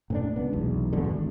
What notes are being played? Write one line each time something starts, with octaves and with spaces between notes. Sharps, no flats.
A2 C4 D4
C#2 B3
F1 B1 E2
E2 G2 B2 D3
G#1